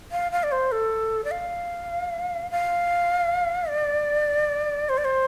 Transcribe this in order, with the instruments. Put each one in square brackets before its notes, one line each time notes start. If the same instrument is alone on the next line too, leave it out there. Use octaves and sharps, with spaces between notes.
[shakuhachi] F5
F5
D5
C5
A4
D5
F5
F5
D5
C5
D5
C5